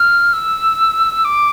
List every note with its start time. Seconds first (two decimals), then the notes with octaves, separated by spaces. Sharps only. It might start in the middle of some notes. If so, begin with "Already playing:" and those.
Already playing: F6
0.33 E6
1.25 D6